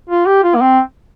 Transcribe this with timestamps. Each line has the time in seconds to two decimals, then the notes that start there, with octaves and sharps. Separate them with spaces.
0.09 F4
0.26 G4
0.43 F4
0.55 A#3
0.61 C4